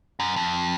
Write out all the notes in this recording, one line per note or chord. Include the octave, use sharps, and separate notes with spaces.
F#2
F2